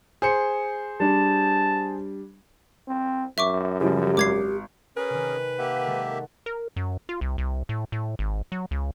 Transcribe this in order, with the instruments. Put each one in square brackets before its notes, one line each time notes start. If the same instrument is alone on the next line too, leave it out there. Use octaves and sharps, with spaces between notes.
[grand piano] G#4 C5 C#7
[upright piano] G3 D4 [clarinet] A5
[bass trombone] C4
[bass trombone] F#2 [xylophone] E5 C#6 D6
[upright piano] C#3 F3 G3 [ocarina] G4
[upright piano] G#1 [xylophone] D6 G#6 C7
[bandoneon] C#4 G#4 A#4 [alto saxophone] B4 [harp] G#5
[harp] C3 D#3
[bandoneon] A#3 G4 E5 [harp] F#5 G#5
[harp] D#3 G#3 A4
[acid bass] A#4
F#2
F4
C2
C2
A2
A2
G#1
F#3
C#2